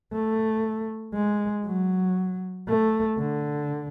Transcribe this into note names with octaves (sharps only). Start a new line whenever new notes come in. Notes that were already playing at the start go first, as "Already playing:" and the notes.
A3
G#3
F#3
A3
D3